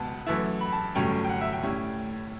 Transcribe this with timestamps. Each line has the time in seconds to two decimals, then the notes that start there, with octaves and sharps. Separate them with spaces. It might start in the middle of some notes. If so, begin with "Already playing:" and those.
Already playing: C#2 B2 B3 F#5 A5
0.26 F#2 E3 A3 E4
0.61 B5
0.72 A5
0.95 G1 G2 F#3 A3 C#4 G5
1.24 G5
1.29 F#5
1.41 E5
1.53 G5
1.63 A2 G3 C#4 E4